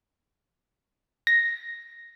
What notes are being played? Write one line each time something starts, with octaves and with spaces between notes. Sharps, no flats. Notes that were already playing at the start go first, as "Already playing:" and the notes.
A#6